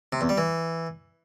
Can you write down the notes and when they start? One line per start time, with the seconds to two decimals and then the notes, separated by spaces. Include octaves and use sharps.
0.13 C3
0.21 E2
0.29 G3
0.38 E3